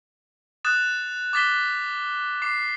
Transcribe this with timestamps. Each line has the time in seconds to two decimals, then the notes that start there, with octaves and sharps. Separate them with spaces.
0.65 D#6 F#6 A6 E7
1.33 D6 D#6 A6 B6 E7 G7
2.42 D6 C7